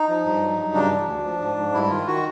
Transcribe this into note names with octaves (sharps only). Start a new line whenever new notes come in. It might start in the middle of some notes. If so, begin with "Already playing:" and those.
Already playing: D#4
F3
G2
F#3
G2
C#3 D4
E3
D2
F3
G#2
G#2
G2 E4
D#3 F4
D#3 F#4